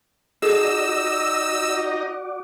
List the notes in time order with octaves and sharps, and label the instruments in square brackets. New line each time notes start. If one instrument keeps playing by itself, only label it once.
[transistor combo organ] D#4 D#5 [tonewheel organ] F#4 D5 [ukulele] G#4 A4 [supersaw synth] E6